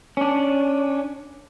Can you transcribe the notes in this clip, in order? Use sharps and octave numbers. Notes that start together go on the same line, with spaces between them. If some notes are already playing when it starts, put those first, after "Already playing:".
C#4 D4